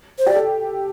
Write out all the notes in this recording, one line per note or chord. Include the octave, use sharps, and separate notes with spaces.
C5
G4 D5
A4